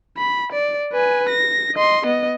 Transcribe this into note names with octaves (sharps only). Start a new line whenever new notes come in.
B5
D5
B4 G#5
A#6
D#5 C6
B3 D#5